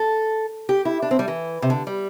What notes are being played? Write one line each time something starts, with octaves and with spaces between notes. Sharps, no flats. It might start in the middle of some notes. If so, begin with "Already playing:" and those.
Already playing: A4
G4
E4
D4
C4
G3
E3
C3
D3
G3